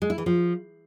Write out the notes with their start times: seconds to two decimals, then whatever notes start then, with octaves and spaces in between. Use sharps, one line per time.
0.02 G#3
0.10 E4
0.18 E3
0.26 F3